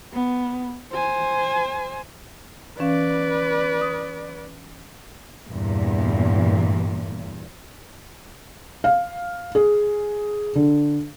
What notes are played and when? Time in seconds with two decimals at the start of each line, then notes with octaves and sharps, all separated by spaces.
0.13 B3
0.92 C5 G#5
2.79 E3 C#4 B4 D5 F5
3.81 D#6
5.47 E2 G2 A#2
8.84 F5
9.55 G#4
10.55 D3